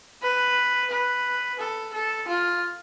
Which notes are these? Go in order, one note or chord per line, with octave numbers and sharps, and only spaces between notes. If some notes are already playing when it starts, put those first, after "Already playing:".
B4
B4
A4
A4
F4